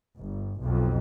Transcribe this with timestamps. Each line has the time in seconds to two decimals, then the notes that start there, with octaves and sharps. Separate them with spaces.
0.18 G1
0.60 B1 F2